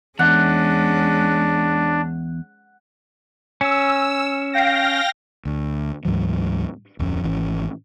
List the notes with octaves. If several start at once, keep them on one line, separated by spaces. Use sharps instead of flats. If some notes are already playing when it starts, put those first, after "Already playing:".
E2 G#3 C#4 D4 F#5
C#4 E6
F5 G5 A#6
D2
D2 G#2 E3 F#3
D1 F2 C#4
G#1 E3 C#4